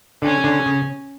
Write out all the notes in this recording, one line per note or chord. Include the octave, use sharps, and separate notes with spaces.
D3 C#4
D3
C#3